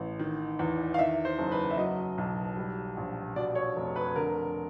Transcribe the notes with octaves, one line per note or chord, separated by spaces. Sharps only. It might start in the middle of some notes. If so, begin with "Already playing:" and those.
Already playing: A1
D#3
E2
F5
D#3 E5
C5
F#1
B4
E5
F#3 D#5
B1
G3
A#1
B2 D5
C#5
F1
B4
D3 A#4